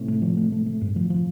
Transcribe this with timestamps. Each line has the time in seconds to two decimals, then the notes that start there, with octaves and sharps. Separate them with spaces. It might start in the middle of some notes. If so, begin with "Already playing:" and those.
Already playing: A2 C3
0.08 A3
0.22 F3
0.37 A3
0.52 A3
0.66 A3
0.81 G2
0.96 F3
1.10 F3